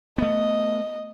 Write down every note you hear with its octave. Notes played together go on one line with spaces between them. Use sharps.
A3 B3 D#5